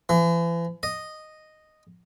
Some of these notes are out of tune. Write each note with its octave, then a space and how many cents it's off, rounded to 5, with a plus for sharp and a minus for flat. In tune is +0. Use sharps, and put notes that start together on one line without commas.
E3 +40
D#5 -5